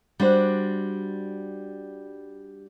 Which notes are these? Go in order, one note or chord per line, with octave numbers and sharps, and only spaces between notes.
G3 D4 F#4 C5